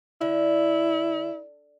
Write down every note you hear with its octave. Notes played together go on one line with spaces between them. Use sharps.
D3 E4